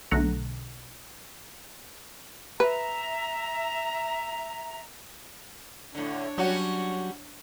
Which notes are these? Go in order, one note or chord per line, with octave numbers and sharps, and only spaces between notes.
B1 D3 A3 F#5 A#5
B4 E5 A#5
A2 D3 D4 C#5
F#3 G3 C#4 F#4